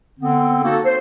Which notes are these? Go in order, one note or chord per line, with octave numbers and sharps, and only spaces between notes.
D3 B3 C4
A#3 D#4 F#4 A4
C5